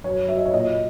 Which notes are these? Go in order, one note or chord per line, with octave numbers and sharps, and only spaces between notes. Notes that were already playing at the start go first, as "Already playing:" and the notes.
F#2 C#5
F#3 E5
D#5
C#5
A#2 D#5